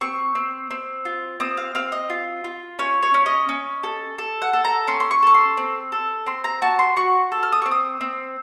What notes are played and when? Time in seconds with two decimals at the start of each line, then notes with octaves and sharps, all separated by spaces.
0.01 C4 C#6
0.35 C4
0.71 C4
1.05 F4
1.40 C4 D#6
1.57 F5
1.75 C4 F5
1.92 D#5
2.10 F4
2.44 F4
2.79 C#4 C#5
3.03 C#5
3.14 C#4
3.26 D#5
3.49 C#4
3.83 A4
4.18 A4
4.42 F#5
4.53 A4
4.65 A#5
4.87 C#4 C6
5.00 C6
5.11 C#6
5.23 A4 C#6
5.34 C6
5.57 C4
5.92 A4
6.26 C4 C6
6.44 A#5
6.62 F#4 A5
6.79 C6
6.96 F#4 C#6
7.32 A4
7.43 F6
7.52 D#6
7.62 C4 C#6
7.71 D#6
8.01 C4